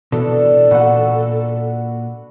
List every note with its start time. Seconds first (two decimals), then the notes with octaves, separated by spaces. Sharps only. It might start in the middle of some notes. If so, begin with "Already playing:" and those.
0.12 B2 E3 D4 A4
0.71 A#2 F#4 B4 F#5